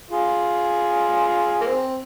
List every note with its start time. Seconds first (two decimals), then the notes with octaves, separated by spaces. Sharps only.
0.10 F4 G#4
1.61 A#3
1.66 C4